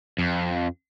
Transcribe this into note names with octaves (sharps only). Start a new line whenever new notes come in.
F2